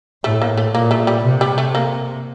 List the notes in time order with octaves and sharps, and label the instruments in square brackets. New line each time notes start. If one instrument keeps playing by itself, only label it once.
[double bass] A2 [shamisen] A3
[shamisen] A#3
A3
[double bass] A#2 [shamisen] A#3
[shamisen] A3
G3
[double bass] C3
[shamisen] G3
A3
A#3